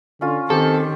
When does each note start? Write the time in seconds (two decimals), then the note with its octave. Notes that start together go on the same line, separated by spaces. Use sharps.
0.21 D3 C#4 F4
0.50 D#3 C4 G4 A4